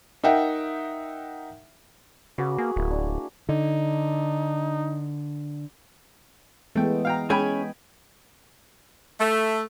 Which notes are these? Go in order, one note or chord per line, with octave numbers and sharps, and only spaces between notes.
D#4 A#4 E5 F#5 G5
C#3 F#4 B4 D6
A#3 G#4
D1 A#3 E4
D4
D3 D#4
E3 G#3 A3 B3 G5
F5 G5 A#5
G#3 C#4 G#4 G5 G#5 B5
A3